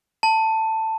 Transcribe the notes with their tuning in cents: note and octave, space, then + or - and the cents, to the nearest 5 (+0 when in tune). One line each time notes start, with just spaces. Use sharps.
A5 +15